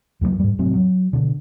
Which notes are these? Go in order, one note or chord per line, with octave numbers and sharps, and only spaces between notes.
F2 F#3 G#3 A#3
G#2 G3
F1 A2 F#3 C4
F#3
B2 D3